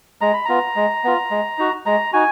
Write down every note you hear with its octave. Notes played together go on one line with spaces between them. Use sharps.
G#3 A#5
B5
B3 F4 A#5
G#3
B3 F4
G#3
D#4 F#4
G#3 A#5
D#4 F#4 G#5